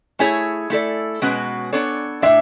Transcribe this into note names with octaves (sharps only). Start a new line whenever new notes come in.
A3 E4 G#4 C#5 G#5
A3 E4 A4 D5
B2 G#3 C#4 F#4 B4
B3 D4 A4 C#5
A2 G#3 D4 E5